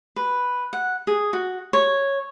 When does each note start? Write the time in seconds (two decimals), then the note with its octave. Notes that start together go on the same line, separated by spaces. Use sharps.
0.16 B4
0.73 F#5
1.07 G#4
1.33 F#4
1.73 C#5